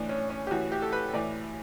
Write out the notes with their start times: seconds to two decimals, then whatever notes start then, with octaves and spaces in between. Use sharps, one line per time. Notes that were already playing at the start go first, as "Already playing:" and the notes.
Already playing: A2 E3 D4
0.09 C#4
0.30 C#4
0.47 G4
0.51 A2 E3 F#4
0.72 G4
0.82 A4
0.93 B4
1.13 A2 E3 D5